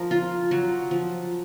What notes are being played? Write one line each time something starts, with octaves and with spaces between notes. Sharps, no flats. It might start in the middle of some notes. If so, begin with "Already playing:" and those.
Already playing: F3 A#4
F4
F#3
F3